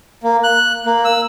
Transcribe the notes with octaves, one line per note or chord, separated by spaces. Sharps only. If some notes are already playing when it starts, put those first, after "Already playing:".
A#3
F#6
A#3
E6